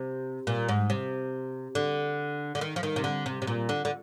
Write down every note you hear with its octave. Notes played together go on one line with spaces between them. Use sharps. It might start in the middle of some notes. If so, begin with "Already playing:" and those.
Already playing: C3
A#2
G#2
C3
D3
D3
D#3
F3
D#3
C3
D3
C3
C3
A#2
D3
D3